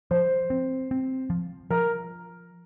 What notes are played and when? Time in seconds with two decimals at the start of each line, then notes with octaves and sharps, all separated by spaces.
0.11 F3 C5
0.50 C4
0.91 C4
1.30 F3
1.70 F3 A#4